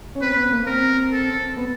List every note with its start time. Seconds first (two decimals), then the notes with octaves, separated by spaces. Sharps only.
0.15 C#4
0.21 C4 B4
0.36 B3
0.51 A#3
0.66 C4 A#4
1.12 A4
1.57 B3